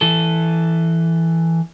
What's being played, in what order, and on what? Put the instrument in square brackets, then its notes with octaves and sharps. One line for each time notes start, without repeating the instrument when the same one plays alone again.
[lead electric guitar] E3 A4